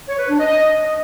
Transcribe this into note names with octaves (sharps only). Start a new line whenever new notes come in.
C#5
B4
D4
D#5